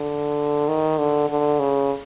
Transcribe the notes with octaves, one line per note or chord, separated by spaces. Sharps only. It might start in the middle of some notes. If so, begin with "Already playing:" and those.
Already playing: D3
D#3
D3
D3
C#3